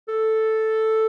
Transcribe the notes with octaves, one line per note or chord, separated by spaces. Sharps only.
A4